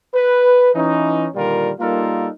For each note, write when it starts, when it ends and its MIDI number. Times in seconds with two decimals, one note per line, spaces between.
0.14 0.71 71
0.74 1.27 52
0.74 1.27 61
0.74 1.27 63
1.35 1.71 46
1.35 1.71 50
1.35 1.71 51
1.35 1.71 55
1.35 1.71 65
1.35 1.71 70
1.80 2.28 55
1.80 2.28 58
1.80 2.28 63
1.80 2.28 65
1.80 2.28 69
1.80 2.28 70